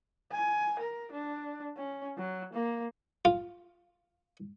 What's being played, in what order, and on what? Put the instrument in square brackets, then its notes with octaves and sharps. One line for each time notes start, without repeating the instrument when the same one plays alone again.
[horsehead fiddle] G#5
A#4
D4
C#4
F#3
A#3
[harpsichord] F4